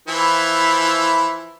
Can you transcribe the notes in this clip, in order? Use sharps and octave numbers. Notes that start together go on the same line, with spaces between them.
E3 F3 E4